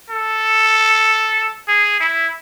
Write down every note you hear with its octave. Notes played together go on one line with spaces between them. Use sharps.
A4
G#4
E4